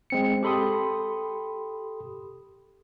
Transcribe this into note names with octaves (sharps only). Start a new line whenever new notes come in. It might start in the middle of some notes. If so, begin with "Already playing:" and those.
G#3 C4 C#7
G4 A4 B5 C6 D#6